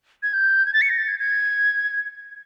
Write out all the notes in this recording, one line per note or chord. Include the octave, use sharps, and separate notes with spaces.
G#6
G6
G#6
A6
C#7
A#6
A6
G#6
G#6